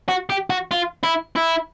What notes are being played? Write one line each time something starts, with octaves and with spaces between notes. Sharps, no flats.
F#4
G4
F#4
F4
E4
E4